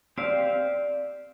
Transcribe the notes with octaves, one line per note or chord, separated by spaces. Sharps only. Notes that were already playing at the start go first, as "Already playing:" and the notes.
C4 G4 C5 D5 F5